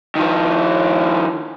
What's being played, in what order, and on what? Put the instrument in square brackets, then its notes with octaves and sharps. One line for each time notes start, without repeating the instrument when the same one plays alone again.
[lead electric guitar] D#3 F3